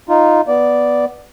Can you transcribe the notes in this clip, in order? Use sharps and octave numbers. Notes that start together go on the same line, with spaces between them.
D#4 F4
B3 D5